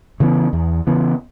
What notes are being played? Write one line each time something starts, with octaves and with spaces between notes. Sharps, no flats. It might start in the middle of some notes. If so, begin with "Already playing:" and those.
C#3 E3 B3
E2
C#3 E3 B3